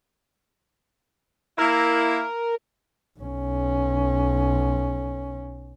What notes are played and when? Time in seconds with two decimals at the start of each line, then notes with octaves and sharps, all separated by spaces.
1.58 A#3 E4 A#4
3.19 B1 C#4